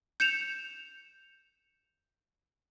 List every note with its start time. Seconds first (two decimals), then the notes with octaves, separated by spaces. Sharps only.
0.20 G6 C#7 E7 F7